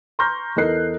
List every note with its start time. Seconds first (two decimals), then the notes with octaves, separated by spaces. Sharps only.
0.19 A#5 C6 C#6 F6 G6 A#6
0.56 E2 A4 A#4 D#5 F#6 C7